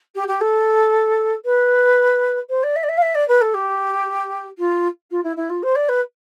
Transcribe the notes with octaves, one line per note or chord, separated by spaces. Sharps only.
G4
G4
A4
B4
C5
D5
E5
D5
E5
F5
E5
D5
B4
A4
G4
F4
F4
E4
E4
F4
C5
D5
B4